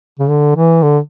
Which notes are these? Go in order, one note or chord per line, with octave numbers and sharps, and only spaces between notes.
C#3
D3
E3
D3